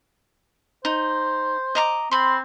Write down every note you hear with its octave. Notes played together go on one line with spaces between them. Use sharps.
D#4 C5
D#5 A#5 D6
C4 B5 C6